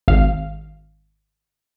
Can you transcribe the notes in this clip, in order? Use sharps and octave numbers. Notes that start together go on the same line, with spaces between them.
G#1 F5